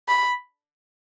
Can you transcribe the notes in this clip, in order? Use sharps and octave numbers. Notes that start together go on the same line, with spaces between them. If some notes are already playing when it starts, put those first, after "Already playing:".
B5